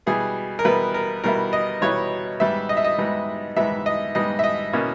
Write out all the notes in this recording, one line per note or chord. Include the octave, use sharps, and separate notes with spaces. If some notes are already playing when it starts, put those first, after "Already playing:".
B2 G3 B3 E4 G#4
A#4
B2 G3 B3 E4 B4
A#4
B2 G3 B3 E4 A#4
D#5
B2 G3 B3 E4 C#5
G#2 G3 B3 E5
D#5
E5
D#5
G#2 G3 B3
G#2 G3 B3 E5
D#5
G#2 G3 B3 D#5
E5
D#5
B2 A#3 C#4 E4